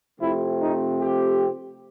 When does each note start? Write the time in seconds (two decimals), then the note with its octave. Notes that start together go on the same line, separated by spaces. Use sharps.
0.19 C3 F3 A3 C4 E4
0.60 D#4
1.00 G4